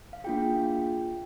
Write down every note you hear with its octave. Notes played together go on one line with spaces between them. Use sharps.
F5
A#3 D4 F4 G#4 G5